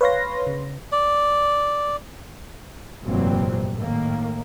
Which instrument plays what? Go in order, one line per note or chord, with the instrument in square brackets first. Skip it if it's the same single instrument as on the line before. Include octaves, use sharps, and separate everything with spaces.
[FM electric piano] B4 C#5 F5 C6 A#6
C#3
[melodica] D5
[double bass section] F1 G2 A#2 E3 F#3 C4
A2 D#3 A#3